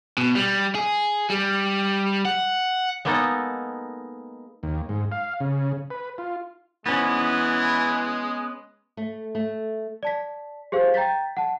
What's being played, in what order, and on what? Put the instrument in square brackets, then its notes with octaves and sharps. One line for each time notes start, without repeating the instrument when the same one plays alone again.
[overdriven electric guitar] B2
G3
G#4
G3
F#5
[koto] G#3 A#3 B3 D#4 A4
[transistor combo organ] D#2
G#2
F5
C#3
B4
F4
[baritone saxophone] E3 [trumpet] G#3 [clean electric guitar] B3 C#4
[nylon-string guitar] A3
A3
[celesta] D5 A5 B6
G4 G#4 C5 F5
G5 A#5 G6 A6 B6
F#5 A5